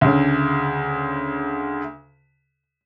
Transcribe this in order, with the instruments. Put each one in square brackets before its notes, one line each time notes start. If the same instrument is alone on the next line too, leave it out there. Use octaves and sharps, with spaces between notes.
[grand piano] D2 C#3